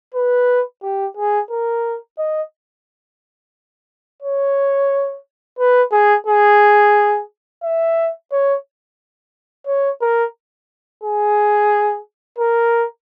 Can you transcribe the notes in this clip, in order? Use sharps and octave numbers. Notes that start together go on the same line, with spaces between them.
B4
G4
G#4
A#4
D#5
C#5
B4
G#4
G#4
E5
C#5
C#5
A#4
G#4
A#4